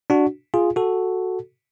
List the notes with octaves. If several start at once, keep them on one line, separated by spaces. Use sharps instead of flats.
D4 F#4
F4 G#4
F#4 A4